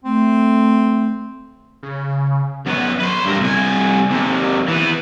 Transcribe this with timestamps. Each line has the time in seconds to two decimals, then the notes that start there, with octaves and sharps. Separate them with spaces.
0.04 A3 C4
1.83 C#3
2.67 F#2 B3
3.00 B4 C6
3.25 G2 A#4
3.41 C2 G#5
4.11 D#2 C3
4.68 E3 B3